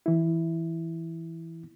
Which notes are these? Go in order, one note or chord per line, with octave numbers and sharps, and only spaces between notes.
E3 E4